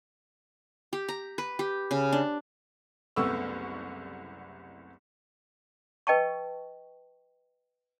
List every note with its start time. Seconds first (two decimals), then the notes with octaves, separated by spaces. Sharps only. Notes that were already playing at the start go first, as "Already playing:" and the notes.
0.93 G4
1.08 A#5
1.38 B4
1.59 G4
1.91 C#3
2.12 D4
3.16 F#1 C2 A3 B3 C#6 E6
6.07 B4 D#5 G5 A5 C#6